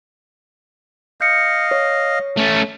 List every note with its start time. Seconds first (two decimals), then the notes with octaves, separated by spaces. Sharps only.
1.21 D#5 F5 G6 C#7
1.71 C#5
2.37 A3 C#4